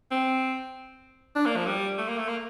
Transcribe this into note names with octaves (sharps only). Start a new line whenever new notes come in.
C4
D4
A#3
F3
G3
A3
A#3
A3
A#3